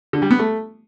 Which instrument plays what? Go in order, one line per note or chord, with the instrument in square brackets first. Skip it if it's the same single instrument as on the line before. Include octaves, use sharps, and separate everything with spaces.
[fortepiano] D3
G3
B3
A3